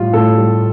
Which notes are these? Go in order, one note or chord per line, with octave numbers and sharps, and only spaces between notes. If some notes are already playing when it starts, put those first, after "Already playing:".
Already playing: A2 G3 F4
A2 A4
G3